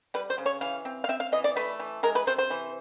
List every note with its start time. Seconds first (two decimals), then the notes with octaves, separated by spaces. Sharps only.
0.14 G3 B4
0.30 C5
0.38 C#3
0.46 C#5
0.61 E3 F5
0.85 C4
1.04 F5
1.09 C4 E5
1.20 F5
1.32 E3 D#5
1.44 D5
1.56 A3 B4
1.80 E3
2.03 G#3 A#4
2.15 B4
2.27 C3 C5
2.38 C5
2.50 E3